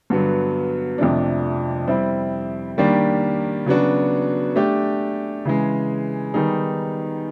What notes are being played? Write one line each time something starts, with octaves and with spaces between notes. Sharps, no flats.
G2 D3 F#3 B3
F2 C3 F3 A3 D4
G3 C4 E4
D#3 G3 A#3 D4 G4
C#3 F#3 B3 D4 F#4
A3 D4 G4
C#3 E3 G#3
D#3 G3 B3 D#4 G#4